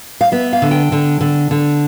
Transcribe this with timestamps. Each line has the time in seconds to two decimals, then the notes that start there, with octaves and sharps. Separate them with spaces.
0.21 F5
0.32 B3 E5
0.53 F5
0.62 D3
0.71 G5
0.92 D3
1.21 D3
1.51 D3